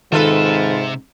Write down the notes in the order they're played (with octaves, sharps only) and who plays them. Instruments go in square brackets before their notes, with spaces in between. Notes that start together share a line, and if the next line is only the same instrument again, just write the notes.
[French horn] G#2 [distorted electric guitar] C3 E5 [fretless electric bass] D#3 [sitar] F4 A4 B4